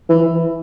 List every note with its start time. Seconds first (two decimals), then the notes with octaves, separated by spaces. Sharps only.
0.09 E3